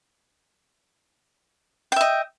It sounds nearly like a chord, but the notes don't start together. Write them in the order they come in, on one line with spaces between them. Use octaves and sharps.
G5 E5 D#5